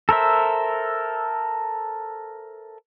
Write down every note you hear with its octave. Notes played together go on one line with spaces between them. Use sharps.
A4 A#4 C5 E5